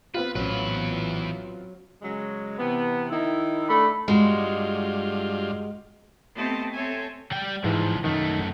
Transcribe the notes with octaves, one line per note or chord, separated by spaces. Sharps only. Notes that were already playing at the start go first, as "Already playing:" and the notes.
B3 C4 F4 B4
A#1 E2 A2 F#3 C#4 B4
C#3 F#3 G#3
C3 E3 B3
D#3 D#4 E4
A3 D4 B5
G2 G#3 F4 F#4
A3 B3 C4 G4 D#5 A5
C4 A4 C#5 E5 G#5
G3 G5
G#2 E3 F3 G#3
F#2 D#3 A3